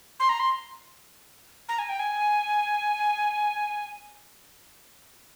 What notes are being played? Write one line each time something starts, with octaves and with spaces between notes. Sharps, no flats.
C6
A#5
C6
A#5
G#5
G5
G#5